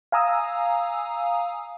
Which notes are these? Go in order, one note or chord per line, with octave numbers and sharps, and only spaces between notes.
F5 G#5 A#5 D#6 E6